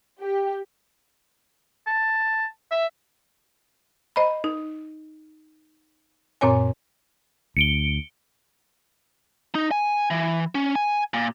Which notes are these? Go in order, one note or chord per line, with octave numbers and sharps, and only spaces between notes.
G4
A5
E5
C5 D#5 A#5 B5
D#4
F#2 A#2 C4 C#5 G#5
D2 C#7 D7 G7
D#4
G#5
E3
C#4
G#5
A#2